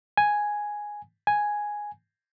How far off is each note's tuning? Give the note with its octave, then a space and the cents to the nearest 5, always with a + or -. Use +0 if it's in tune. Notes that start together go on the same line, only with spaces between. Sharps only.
G#5 +0
G#5 +0